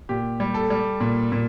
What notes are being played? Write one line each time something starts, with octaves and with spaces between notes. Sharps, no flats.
A#2 G4
G3
A4
G3
A#2
A#2